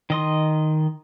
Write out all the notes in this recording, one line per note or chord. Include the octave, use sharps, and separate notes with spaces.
D#3 D#5 C6